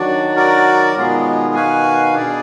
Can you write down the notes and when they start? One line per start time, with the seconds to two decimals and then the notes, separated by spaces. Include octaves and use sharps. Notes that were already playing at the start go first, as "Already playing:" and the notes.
Already playing: D#3 F#3 D4 F#4 D5
0.36 F#4 A#4 D5
0.92 F3
0.96 B2 D#3 G#3 B3 F4 G#4
1.55 F#4 B4 F5 G#5
2.14 B2 D4 G#4 D5